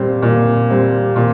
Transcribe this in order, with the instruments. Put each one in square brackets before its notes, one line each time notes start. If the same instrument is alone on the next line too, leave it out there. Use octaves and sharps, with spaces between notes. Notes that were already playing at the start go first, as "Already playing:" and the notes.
Already playing: [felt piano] A#2 G3 C4
A#2
G3 C4
A#2